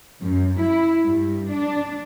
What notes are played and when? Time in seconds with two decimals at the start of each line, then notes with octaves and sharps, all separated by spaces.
0.21 F#2
0.59 E4
1.02 G2
1.49 D4